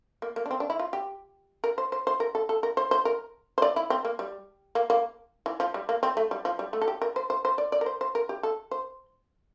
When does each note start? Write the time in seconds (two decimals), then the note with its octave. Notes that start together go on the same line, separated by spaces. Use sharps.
0.22 A#3
0.36 A#3
0.46 D4
0.51 C4
0.60 D4
0.70 E4
0.79 F4
0.93 G4
1.64 A#4
1.78 C5
1.92 C5
2.07 C5
2.20 A#4
2.35 A4
2.49 A4
2.63 A#4
2.77 C5
2.91 C5
3.05 A#4
3.58 C5
3.62 D5
3.76 E4
3.90 C4
4.05 A#3
4.19 G3
4.75 A#3
4.90 A#3
5.46 E3
5.60 F3
5.74 G3
5.89 A#3
6.03 C4
6.17 A3
6.31 G3
6.45 F3
6.59 G3
6.73 A3
6.81 A4
6.88 G4
7.02 A#4
7.16 C5
7.30 C5
7.45 C5
7.58 D5
7.72 D5
7.81 A#4
7.86 C5
8.01 C5
8.15 A#4
8.29 G4
8.43 A4
8.71 C5